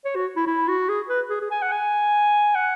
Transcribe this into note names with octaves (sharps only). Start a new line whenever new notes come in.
C#5
F#4
E4
E4
F#4
G#4
B4
G#4
G#4
G#5
F#5
G#5
F#5